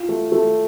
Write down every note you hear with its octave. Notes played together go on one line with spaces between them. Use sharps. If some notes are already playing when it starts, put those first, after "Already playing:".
Already playing: F4
A3
A3